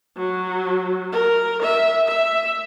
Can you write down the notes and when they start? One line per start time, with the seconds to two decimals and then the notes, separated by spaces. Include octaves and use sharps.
0.17 F#3
1.12 A#4
1.63 E5
2.07 E5